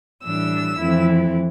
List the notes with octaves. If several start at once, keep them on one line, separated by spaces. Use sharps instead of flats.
A2 E3 G3 D4 E6
F2 E3 A3 C4 E4